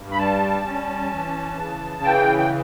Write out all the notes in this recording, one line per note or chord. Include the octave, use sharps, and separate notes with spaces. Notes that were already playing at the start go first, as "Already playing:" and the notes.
Already playing: G2
B5
G3 A5
C#4
E3
C#3
E3 G5
G5